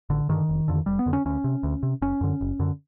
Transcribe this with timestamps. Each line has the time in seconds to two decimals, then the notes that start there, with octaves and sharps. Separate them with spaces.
0.10 A1 D3
0.29 G2 D3 D#3
0.49 F1
0.68 F2 D3
0.86 F1 G3
0.99 B3
1.06 F2 D3
1.13 C#4
1.26 D2 C#4
1.44 C3
1.63 D2
1.83 C3
2.02 F#1 C#4
2.21 F#2 D3
2.41 F#1
2.59 F#2 D3